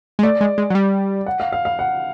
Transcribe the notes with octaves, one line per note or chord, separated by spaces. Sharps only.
G#3
A3 D5
G#3
G#3
F#3
G3
F#5
F5
F5
F5
F#5